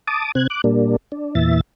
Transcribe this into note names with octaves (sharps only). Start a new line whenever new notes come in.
A5 D6 D#6
C3 C4 F#6 G#6
D6 F#6
A#2 G3 A#3 D4
D4
E2 A#2 E3 E5 A6